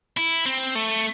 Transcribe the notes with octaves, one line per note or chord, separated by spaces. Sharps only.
E4
C4
A3